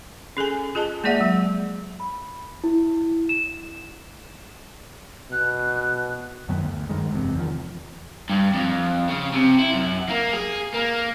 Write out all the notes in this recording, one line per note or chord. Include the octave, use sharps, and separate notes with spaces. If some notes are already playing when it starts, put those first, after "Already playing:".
C#4 G#4 A4 G#5
F4 G#4 D#5 A5
G#3 A#3 G#4 D5 E5 F#5
F#3
B5
E4
E7
B2 F#6
F#2 D#3 F#3 B3
D2
G2 D#3 G#3
F#1 E2 C3
E2 D#3 F3
G2
F2
C#3
C3
E4
F#2
A#3
G#4
A#3